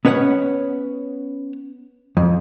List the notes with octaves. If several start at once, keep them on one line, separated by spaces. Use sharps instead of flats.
B3 C#4 B4 C#5 F#5
F2